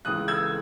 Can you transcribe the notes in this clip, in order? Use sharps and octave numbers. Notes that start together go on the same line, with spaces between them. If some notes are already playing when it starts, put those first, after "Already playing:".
C#2 C#3 E3 D#6 F#6
E6 G#6